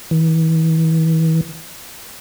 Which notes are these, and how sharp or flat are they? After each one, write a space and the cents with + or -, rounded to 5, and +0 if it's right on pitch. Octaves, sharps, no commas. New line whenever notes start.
E3 -35